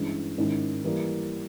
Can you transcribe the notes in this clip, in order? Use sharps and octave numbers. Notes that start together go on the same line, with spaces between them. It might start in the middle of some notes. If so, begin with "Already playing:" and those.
Already playing: G2 E3 G#3 C#4
G#2 D#3 G#3 C#4 E4
E3 G3 A#3